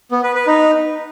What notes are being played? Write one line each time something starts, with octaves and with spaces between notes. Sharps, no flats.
B3
B4
B4
D#4